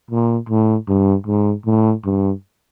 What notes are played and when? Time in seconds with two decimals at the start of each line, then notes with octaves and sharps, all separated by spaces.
0.11 A#2
0.49 A2
0.88 G2
1.27 G#2
1.66 A2
2.05 G2